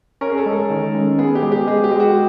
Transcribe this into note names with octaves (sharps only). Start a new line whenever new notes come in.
C#4 A#4
G#4
A4
G#3
A4
D#3
G#3
B3 G#4
G4
G#3
G4
G#3 G#4
G4
G#3
F#4